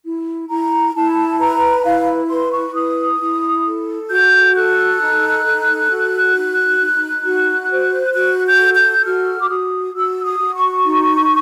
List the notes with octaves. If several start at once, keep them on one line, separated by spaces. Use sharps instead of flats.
E4
E4 A#5
E4 A5
B4 A#5
E4 F5
B4 C6
C#6
E4 D#6
E4
A4
F#4 G6
A4 F#6
D#4
A4
F#4
D#4
D#4
F#4
C5
F#4 F#6
G6
A4
G6
F#4 F6
D6
F#4 D#6
F#4 E6
D#6
F#4
C#6
D#4